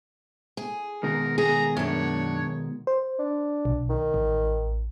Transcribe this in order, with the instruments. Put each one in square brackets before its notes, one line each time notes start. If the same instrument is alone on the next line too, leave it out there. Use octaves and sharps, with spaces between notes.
[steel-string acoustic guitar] G#4
[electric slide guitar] B2 D#3 G#3 [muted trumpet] A#4
[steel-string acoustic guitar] G#4 [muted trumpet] A#5
[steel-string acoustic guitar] F#2 D4 [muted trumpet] C#5
[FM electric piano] C5
[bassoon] D4
[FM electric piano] B1
[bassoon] D#3
[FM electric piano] A1